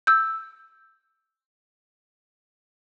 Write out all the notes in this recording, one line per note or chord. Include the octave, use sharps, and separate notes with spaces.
E6 G6